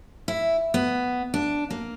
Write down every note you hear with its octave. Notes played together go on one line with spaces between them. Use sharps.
E4
B3
D4
A#3